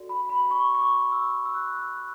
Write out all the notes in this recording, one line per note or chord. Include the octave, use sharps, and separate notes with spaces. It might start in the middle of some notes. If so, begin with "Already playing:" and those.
Already playing: F#4 A4 D5
B5
B5
C#6
C#6
D6
E6
E6
F#6
E6
F#6